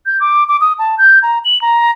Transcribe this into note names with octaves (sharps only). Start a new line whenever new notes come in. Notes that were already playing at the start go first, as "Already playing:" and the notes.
G6
D6
D6
D#6
A5
G6
A#5
F#7
A#5